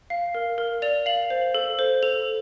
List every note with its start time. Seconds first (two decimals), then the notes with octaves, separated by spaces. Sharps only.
0.10 F5
0.35 A#4
0.58 A#4
0.82 D5 F7
1.06 F5 F#7
1.30 C5
1.55 A4
1.79 C5
2.03 A4 F7